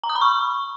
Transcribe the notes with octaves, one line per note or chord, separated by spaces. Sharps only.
A#5
D#6
B5
C#6